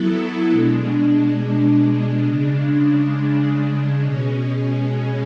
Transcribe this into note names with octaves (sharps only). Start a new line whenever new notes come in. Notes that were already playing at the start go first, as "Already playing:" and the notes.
Already playing: F#3 B3 E4 A4
B2 G#3 D4
C#3 G#3 D4
B2 G#3 C#4